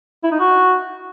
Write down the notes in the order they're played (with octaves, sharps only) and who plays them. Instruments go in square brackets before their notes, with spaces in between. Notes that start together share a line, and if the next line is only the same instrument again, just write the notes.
[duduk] E4
D#4
F#4